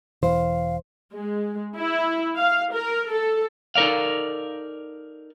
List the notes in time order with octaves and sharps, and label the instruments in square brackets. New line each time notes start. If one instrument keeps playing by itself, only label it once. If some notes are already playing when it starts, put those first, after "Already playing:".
[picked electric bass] E1 E3 [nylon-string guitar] C5 [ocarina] F5
[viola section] G#3
E4
F5
A#4
A4
[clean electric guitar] D#4 A4 A#4 D5 F5